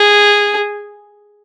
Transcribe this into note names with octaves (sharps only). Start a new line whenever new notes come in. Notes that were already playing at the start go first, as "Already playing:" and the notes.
Already playing: G#4